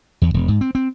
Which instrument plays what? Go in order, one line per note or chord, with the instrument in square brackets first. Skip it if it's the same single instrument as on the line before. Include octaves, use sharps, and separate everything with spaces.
[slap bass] E2
E1
G#2
C4
C4